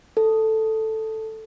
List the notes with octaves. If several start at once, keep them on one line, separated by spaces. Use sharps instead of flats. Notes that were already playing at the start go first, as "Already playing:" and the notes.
A4